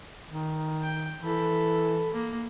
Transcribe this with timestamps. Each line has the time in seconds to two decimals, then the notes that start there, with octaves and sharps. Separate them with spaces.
0.31 D#3
0.83 G5
1.23 E3 A4 B5
2.13 A#3